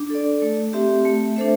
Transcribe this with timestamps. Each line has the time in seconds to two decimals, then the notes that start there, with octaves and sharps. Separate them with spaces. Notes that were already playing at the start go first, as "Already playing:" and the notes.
Already playing: D4
0.10 A4 D5
0.42 A3
0.73 C4 G4 E5
1.05 A3
1.36 D4 A4 C5 E5